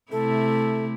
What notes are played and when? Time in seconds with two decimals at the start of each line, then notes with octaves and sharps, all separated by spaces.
0.12 C3 A3 E4 A4